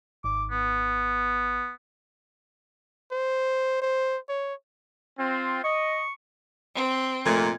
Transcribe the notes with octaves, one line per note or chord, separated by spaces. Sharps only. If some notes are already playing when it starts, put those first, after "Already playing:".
G#1 D6
B3
C5
C5
C#5
C4 F4
D#5 C#6
C4
F1 A#2 A3 G#6